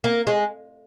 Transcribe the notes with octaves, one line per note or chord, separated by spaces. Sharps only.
A#3
G#3